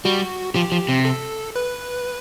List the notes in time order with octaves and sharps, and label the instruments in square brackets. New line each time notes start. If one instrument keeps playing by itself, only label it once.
[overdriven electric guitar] G3 [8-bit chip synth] F#4
[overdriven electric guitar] F3 [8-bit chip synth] G4
[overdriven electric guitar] F3
C3
[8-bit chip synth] A4
B4